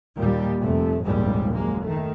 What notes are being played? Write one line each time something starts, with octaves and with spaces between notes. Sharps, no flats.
D#2 A#2 G3
F1 C3 A3
F1 A#1 D#2 G#2 G3 G#3
F#1 F#2 G#3 A#3
D#3 A3